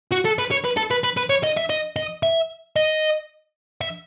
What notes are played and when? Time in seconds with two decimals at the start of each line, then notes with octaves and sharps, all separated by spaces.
0.11 F#4
0.25 A4
0.39 B4
0.51 C#5
0.65 B4
0.77 A4
0.91 B4
1.04 B4
1.17 B4
1.30 C#5
1.44 D#5
1.57 E5
1.70 D#5
1.96 D#5
2.23 E5
2.76 D#5
3.81 E5